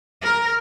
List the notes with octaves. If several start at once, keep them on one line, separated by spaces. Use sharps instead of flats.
A#4